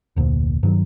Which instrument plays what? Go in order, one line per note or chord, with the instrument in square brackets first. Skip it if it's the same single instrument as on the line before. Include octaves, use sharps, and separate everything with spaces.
[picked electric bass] F1 D2 A#2
G2 D#3 F3 F#3